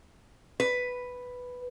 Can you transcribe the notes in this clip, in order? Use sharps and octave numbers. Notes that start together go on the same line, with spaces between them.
B4